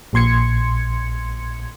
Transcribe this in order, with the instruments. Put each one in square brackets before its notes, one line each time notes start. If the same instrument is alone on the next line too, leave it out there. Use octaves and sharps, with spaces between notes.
[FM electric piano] A#1 A#2 C6 G#6 C#7